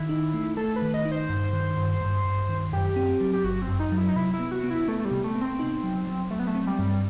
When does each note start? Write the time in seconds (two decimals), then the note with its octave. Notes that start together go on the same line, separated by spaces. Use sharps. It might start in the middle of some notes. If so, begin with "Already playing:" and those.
Already playing: D#3 E4
0.09 D#4
0.34 A3
0.57 A3 A4
0.76 B4
0.82 D#3
0.94 D#5
1.05 D#4
1.12 C5
1.29 G2
1.53 D#3
1.77 G2
2.01 G2
2.25 G2
2.49 D#3
2.72 F#2 G4
2.96 C4
3.21 F#3
3.33 G4
3.44 G1 F#4
3.62 C4
3.68 F#2
3.79 D#4
3.92 F#3
3.97 E4
4.08 D#4
4.16 C3 E4
4.34 E4
4.39 B3
4.51 F#4
4.64 B3
4.70 E4
4.88 A3 B3
5.00 A3
5.05 G3
5.11 C3
5.24 A3
5.35 B3
5.41 C4
5.59 D#4
5.83 F#3
6.07 F#3
6.31 F#3 A3
6.39 B3
6.47 A3
6.55 C4
6.67 G3
6.79 G2